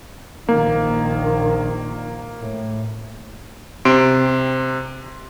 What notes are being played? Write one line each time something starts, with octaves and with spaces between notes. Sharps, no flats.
A#1 D#3 A#3
A2
C3 C6 D7